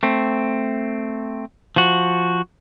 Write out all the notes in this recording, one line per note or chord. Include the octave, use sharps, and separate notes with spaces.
A3 C4
F3 F#4